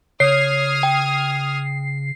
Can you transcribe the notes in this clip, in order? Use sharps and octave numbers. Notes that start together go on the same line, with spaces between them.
C#3 C#5 D#6 F6 G#6 C7
G5